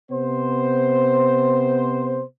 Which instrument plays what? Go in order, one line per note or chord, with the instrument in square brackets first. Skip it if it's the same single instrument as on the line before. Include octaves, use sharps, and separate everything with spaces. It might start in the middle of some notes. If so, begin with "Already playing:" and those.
[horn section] C3 B3 C5